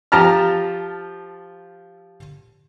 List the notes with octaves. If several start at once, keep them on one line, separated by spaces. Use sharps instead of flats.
F3 G4 A5 A#5 F6